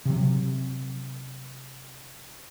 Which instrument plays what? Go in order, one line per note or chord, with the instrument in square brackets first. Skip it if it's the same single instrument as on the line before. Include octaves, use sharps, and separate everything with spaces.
[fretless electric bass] C3 F#3